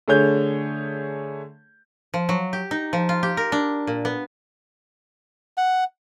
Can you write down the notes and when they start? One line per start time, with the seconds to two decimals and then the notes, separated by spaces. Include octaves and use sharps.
0.08 D3 A3 G#4 C#5 G6
2.14 F3
2.29 F#3
2.53 G4
2.71 D#4
2.93 F3
3.09 F4
3.23 G4
3.37 A#4
3.52 D4
3.87 A#2
4.05 B3
5.57 F#5